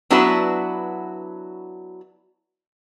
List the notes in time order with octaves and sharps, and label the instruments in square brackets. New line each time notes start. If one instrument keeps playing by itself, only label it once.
[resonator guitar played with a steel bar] F#3 B3 D4 E4 F#4 B4